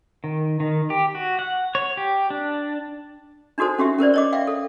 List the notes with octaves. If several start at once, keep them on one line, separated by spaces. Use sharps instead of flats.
D#3
D#3
G4
F#4
F#5
C#5
G4
D4
D4 D#4 F#4 A4 C5
C#4 F#4 G4 E5
C#4 A#4 C5 D5
C#5 D#5 D6
E5 F5 G5
A4